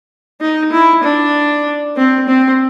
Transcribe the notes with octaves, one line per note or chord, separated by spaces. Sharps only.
D#4
E4
D4
C4
C4